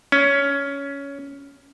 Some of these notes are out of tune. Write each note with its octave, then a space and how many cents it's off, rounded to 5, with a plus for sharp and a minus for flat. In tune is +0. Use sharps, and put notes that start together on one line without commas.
C#4 +15